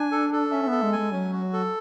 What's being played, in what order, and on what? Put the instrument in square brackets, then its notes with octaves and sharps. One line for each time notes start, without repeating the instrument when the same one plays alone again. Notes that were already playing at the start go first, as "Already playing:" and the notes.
Already playing: [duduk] D4 [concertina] G#5
[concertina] A4
A4
[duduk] C#4 [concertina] E5
[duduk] C#4
[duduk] B3 [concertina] A4
[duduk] G#3
[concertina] G#5
[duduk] G#3
[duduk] F#3 [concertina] C#4
[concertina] F#4
A4